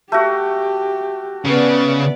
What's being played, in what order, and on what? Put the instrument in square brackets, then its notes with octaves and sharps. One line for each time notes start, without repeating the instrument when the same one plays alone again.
[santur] A3 F#4 [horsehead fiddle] G4
[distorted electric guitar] C#3 [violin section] B3 D5